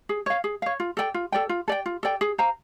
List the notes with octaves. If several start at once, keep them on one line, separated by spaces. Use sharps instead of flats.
G#4
C#5 F5
G#4
C#5 F5
F4
A4 D5 G5
F4
A4 D5 G5
F4
A4 D5 G5
F4
A4 D5 G5
G#4
C5 F5 A#5